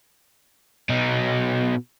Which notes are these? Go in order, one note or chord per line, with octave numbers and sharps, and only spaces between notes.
B2 D#4